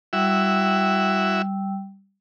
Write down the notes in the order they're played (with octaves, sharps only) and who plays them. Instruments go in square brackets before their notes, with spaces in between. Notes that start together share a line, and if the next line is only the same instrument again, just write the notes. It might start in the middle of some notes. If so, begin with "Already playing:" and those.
[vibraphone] G3 G5 E6 [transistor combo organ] E4 F#4 E5